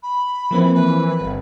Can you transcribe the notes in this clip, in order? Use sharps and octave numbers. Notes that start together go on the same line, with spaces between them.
B5
E3 F3 A#3 C4
B4
G1